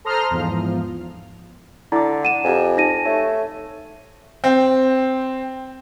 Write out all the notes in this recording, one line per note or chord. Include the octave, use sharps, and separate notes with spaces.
A4 C5 A#5 C6 D#6 F6
E2 G#2 F3
D3 E4 A#5 D6
F#5 D#7 E7
F2 G4 G#5
D#4 A5 A#6 D#7
A3 C#5
C4